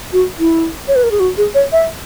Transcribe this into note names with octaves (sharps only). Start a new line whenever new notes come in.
F#4
E4
C#5
B4
A#4
G#4
F#4
G#4
C#5
E5